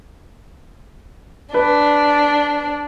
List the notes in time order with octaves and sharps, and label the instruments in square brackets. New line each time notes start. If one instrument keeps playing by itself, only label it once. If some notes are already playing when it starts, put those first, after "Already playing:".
[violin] D4 [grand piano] B4